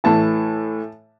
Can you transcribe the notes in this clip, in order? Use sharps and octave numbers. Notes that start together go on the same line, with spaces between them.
A2 E3 A5